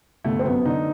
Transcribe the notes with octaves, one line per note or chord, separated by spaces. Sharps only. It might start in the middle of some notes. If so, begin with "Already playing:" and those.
G1 A3
C4
F#2 B3
D3 D#4